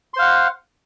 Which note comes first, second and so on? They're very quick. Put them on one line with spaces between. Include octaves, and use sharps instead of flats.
C6 C5 F5 F#5